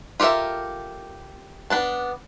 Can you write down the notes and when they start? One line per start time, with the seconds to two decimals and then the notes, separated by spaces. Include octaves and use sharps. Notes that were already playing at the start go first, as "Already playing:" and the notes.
0.20 F4 G4 A4 A#4 E5
1.70 B3 D4 A5